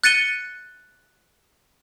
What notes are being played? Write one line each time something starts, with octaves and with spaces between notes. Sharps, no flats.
F#6 A6 C#7 D#7 G7